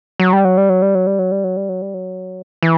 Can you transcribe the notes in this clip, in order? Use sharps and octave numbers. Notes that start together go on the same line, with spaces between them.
F#3
G3
F#3
G3
F#3
G3
F#3
G3
F#3
G3
F#3
G3
F#3
G3
F#3
E3